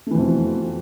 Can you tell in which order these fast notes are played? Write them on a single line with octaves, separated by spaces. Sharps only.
A3 E3 F2 B2